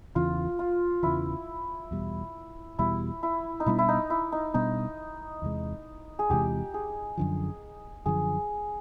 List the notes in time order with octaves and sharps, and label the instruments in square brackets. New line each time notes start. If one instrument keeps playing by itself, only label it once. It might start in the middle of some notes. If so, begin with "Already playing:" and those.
[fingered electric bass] E2 C#3 E3 [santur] F4
[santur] F4
[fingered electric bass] E2 C#3 E3 [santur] E4
[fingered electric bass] E2 B2 G3
[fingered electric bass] E2 B2 G3 [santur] E4
[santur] E4
D#4
[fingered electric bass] B2 G3 B3 D4 [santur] E4
[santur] E4
D#4
E4
D#4
[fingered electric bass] B2 G3 B3 D4 [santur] D#4
[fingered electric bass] E2 C3 E3 G#3
[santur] G#4
[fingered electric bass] E2 C3 E3 G#3 [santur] G4
[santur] G#4
[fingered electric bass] F#2 D3 F3
[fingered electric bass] F#2 D3 F3 [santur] G#4